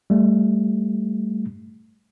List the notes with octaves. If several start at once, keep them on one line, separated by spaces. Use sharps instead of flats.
G3 A3